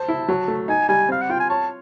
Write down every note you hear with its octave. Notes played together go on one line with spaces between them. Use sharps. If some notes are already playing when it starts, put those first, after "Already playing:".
Already playing: C5 A5
E4
F#3
A3
D#4 G#5
G3 G#5
C4 F5
F#5
F4 G5
G#5
C#5 A5